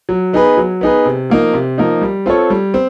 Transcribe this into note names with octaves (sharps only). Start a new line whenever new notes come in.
F#3
B3 D#4 G#4 B4
F#3
B3 D#4 G#4 B4
C3
F3 A#3 D#4
C3
F3 A#3 D#4
G3
C4 F4 A4 C#5
G3
C4